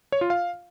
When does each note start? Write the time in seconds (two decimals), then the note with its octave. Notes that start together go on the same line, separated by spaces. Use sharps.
0.12 C#5
0.21 F4
0.30 F5